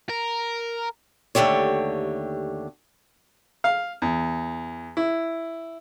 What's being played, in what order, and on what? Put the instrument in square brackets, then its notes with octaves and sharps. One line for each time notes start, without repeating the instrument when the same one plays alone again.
[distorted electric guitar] A#4
[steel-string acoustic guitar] D#2 D3 A3 G4 C#5
[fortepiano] F5
E2
E4